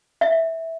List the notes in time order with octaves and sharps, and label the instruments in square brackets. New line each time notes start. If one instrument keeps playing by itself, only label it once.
[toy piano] E5